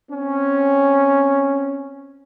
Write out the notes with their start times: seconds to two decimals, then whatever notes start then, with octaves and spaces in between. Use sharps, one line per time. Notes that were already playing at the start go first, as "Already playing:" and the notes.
0.10 C4 C#4